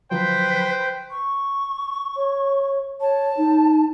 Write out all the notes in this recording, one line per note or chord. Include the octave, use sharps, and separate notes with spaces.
D3 F3 F#3 B4 C5 G5
C#6
C#5
C#5 A5
D#4